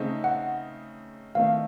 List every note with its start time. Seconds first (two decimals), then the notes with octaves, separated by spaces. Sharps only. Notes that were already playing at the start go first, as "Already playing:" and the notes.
Already playing: C#3 A3 C4 D#4
0.24 F#5
1.35 D#3 A3 C4 D#4 F5